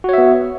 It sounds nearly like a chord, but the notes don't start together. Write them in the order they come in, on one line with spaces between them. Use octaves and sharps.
F#4 C#5 E5 B3